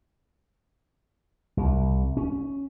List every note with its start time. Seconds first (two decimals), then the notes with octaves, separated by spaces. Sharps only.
1.57 C2
2.17 C#4